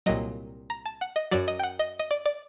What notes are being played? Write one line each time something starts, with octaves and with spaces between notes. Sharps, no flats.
C2 A#2 F#3 D#5
A#5
A5
F#5
D#5
F#2 F#3 D5
D#5
G5
F#5
D#5
D#5
D5
D5